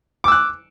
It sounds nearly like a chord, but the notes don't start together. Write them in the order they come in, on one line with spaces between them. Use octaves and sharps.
D6 E6 F#6